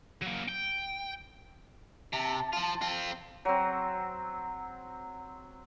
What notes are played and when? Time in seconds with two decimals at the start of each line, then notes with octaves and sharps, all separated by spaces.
0.22 F#3 A#3
0.49 G5
2.13 C3 A5
2.53 F3 F4
2.82 C4 F4
3.45 F#3 C4